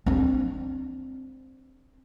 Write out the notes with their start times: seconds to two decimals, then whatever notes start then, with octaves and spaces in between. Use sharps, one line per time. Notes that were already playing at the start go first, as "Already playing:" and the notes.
0.06 C4 D4